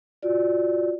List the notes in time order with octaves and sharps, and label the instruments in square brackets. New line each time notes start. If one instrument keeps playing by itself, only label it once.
[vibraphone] F4 F#4 D5